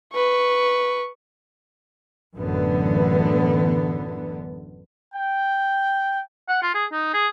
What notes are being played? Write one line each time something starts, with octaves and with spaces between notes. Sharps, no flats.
B4 C#6
A1 F#2 D3 E3 B3
G5
F#5
F4
G#4
D#4
G#4